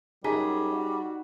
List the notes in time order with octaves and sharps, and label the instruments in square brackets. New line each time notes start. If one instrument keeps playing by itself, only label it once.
[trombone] F#2 [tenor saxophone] G3 [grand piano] D#4 A#5 B6 [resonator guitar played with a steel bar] G#4
[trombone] F#4